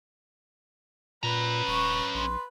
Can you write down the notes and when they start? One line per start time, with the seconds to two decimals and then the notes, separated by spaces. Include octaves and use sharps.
1.23 A#2 C#4 B4 A#5
1.67 D#1 C#6
2.14 A#1 C6